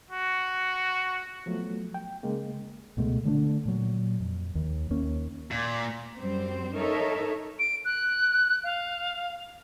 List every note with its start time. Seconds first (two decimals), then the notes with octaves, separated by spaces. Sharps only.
0.11 F#4
1.46 F3 F#3 A3 B3
1.94 G5
2.23 C#3 G#3 A#3
2.97 C#2 B2 G#3 A3
3.25 D3 A3 B3 D4
3.66 A#2 F#3
4.20 F2
4.55 D#2
4.90 D#2 A#3 C#4
5.51 A#2
6.18 F#2 G3 C4 C5
6.76 D#4 A4 A#4 C#5 E5
7.59 D7
7.85 F#6
8.64 F5